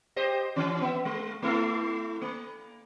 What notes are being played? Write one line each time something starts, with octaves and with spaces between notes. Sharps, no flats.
G4 C5 D#5
E3 C#4
B3 E5
G#3
A3 E4 A4
A#3